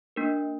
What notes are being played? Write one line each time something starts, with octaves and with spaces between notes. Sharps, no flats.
A#3 D4 A#4